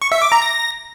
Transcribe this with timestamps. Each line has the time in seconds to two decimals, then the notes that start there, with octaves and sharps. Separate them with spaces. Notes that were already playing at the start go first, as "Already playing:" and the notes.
0.02 C#6
0.12 E5
0.22 D6
0.32 A#5
0.42 A#6